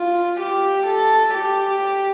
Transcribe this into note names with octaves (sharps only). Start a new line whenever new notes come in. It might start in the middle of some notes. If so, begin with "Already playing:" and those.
Already playing: F4
G4
A4
G4